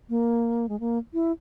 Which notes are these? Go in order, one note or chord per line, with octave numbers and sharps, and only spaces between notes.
A#3
G#3
A#3
E4